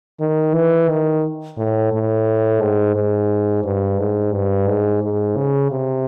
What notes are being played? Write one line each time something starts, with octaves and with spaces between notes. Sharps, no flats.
D#3
E3
D#3
A2
A2
G#2
G#2
G2
G#2
G2
G#2
G#2
C#3
C3